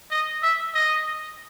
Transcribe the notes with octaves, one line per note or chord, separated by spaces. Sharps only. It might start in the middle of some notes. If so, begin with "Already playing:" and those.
D#5
E5
D#5